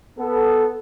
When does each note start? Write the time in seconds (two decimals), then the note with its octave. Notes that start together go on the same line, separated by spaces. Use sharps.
0.19 B3 A4